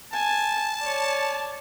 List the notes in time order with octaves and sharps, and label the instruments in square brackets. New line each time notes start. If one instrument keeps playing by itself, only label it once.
[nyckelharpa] G#5 [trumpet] A5
[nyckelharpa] C#5 D5